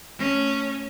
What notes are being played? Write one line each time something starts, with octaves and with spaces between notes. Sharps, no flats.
A3 C#4